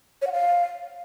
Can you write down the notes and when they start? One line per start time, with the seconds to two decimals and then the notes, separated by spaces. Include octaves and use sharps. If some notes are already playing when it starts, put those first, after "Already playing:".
0.22 C#5
0.27 F#5
0.32 F5